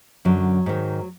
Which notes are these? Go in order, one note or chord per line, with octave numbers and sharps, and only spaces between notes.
F#2 D3 F#3
G#2 D#3